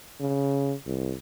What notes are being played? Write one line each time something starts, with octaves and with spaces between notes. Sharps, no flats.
C#3
C2